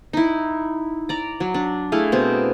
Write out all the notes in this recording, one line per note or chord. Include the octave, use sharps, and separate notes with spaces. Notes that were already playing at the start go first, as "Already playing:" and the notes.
D#4 E4
D5 A#5
F#3
D4
A3 E4 G#4 F5
B2 C4